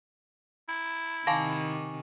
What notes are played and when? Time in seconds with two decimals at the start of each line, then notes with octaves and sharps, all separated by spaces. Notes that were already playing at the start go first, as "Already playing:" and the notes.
0.69 E4
1.27 C3 D#3 F5 G#5 A5 C#6 D6 A#6